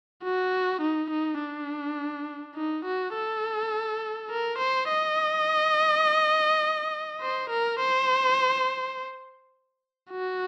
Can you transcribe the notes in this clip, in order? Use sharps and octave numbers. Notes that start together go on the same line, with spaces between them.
F#4
D#4
D#4
D4
D#4
F#4
A4
A#4
C5
D#5
C5
A#4
C5
F#4